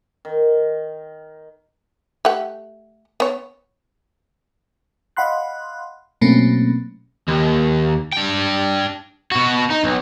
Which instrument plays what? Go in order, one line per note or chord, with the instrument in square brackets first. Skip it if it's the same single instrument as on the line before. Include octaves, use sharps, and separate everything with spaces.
[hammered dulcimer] D#3
[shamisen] A3 G4 F#5
B3 C#5
[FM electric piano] D#5 F5 F#5 B5 C6 F#6
B2 F#3 A3 A#3 C4 C#4
[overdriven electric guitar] D#2
D4 G5
B2 F#4
D#4
B1